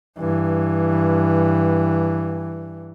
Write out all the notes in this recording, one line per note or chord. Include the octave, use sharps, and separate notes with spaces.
G2 E3